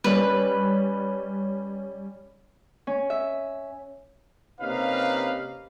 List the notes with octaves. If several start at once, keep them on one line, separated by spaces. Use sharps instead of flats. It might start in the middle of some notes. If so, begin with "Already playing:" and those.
G3 C#4 B4
C#4
E5
C3 A#3 C#4 D#4 B4 F5